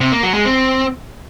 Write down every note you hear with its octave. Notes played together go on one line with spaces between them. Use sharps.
C3
A#3
F#3
G#3
C4